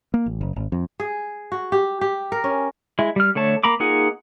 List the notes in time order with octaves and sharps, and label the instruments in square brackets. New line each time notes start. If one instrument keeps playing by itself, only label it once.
[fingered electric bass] A#3
A1
F#1
G#1
F2
[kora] G#4
F#4
G4
G4
A#4
C#4
[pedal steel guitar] G#3 E4
G3 F6
D3 A3 C#5 A5
A#3 A#5 B5 D6
A#3 D#4 F4 G#4 F#5